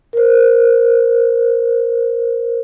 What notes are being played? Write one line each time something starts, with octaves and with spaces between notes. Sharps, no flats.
A#4 C5